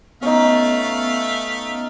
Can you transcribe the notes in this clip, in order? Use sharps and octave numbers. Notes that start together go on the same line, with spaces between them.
A3 B3 C#4 D#4 E5 F5